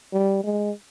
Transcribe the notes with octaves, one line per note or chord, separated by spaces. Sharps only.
G3
G#3